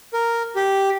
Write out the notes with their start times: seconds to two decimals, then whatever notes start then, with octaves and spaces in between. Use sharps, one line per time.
0.14 A#4
0.56 G4